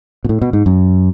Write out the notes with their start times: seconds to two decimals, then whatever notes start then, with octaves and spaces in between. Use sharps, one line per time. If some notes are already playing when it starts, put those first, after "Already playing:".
0.24 B2
0.29 A2
0.42 B2
0.53 G#2
0.66 F#2